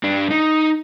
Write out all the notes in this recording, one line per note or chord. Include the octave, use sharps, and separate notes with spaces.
G2 D4
D#4